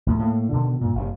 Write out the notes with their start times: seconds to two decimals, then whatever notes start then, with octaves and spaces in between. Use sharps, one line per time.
0.06 D#2 A2 C#3
0.19 A2 A#3
0.52 B2 D3 D#3 B3
0.81 G2 A#2
0.95 F#1 F#2 C3